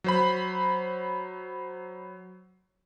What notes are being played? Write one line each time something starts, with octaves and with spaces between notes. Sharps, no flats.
F#3 C5 B5